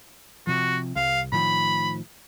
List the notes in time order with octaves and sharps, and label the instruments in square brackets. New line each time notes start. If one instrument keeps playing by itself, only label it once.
[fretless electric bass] C3 F3 [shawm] F#4
[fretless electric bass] C2 [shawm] F5
[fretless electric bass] A2 D#3 F3 [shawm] B5